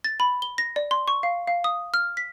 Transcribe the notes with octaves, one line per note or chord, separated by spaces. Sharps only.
A6
B5
G7
A#6
D5
C6
C#6
F5
F5
D#6
F6
B6